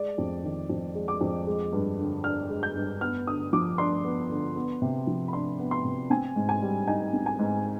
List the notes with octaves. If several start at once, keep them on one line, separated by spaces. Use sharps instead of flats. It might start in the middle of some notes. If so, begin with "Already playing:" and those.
Already playing: G#3 D5
F2
D#3
F2
G#3
D6
F2
G#3
G2
D3
D4 F6
G#3
G6
G2
B3 F6
D3 D#6
F3 D6
D4 C6
B3
D3
B3
C3
F3
B5
D4 C6
B3
C6
C3
C4 G#5
G#2
G#5
G3
D#4 G#5
C4
G#5
G#2